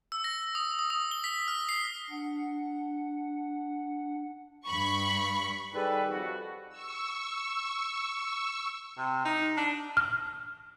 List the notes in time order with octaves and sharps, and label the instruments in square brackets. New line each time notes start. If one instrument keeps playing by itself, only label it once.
[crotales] E6
A#6
D#6
D#6
D#6
G7
B6
F6
C7
[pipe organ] D4 F#5
[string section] G2 B5 C#6
[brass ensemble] D#3 G3 G#4 A4 B4
F2 F#4
[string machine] C#6 E6
[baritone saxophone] C3
D#4
D4
[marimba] F6